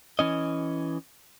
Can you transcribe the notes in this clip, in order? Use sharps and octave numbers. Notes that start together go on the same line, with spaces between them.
E3 C#4 D#5